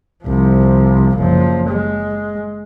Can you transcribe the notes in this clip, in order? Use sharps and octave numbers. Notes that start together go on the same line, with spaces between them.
C2 F3
F#1 F3
G#3